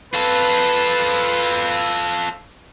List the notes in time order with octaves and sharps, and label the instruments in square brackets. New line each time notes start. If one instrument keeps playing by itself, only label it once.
[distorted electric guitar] F4 A4 [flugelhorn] B4